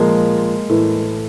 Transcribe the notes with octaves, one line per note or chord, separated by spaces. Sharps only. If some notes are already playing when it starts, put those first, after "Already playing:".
Already playing: A#2 F3 G#3 A#3
A2 E3